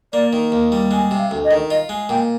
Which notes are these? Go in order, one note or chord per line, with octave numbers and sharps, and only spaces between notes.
A#3 D5
D#3
D#2
G3
G#3 G#5
C3
F5
D2
D#5
D#3
F4 D#5
G#3
A#2 G5